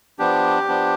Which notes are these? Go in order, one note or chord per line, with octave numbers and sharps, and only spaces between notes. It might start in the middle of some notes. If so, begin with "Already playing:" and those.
F3 B3 D4 G4
F3 B3 D4